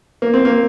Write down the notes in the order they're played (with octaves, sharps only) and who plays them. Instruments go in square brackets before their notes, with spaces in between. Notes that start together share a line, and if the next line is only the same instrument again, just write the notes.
[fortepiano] A#3
C4
A#3